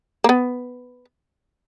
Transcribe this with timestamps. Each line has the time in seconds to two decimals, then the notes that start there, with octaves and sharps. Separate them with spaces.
0.24 A#3
0.29 B3